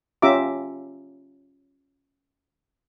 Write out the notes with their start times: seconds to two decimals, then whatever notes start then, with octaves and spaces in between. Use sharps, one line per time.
0.22 C#4 F4 G4 E5 A#5 D6